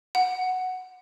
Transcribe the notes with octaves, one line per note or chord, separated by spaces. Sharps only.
F#5